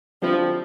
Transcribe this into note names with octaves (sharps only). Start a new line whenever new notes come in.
D3 F3 G3 C4 E4